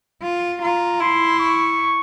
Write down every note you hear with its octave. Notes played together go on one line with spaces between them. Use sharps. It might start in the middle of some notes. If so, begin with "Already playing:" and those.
F4
F4 A#5
E4 C6
C#6